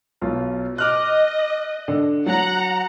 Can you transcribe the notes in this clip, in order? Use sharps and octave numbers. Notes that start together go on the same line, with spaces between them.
B1 F4
D#5 D6 F6 F#6
D3
F#3 F#5 A#5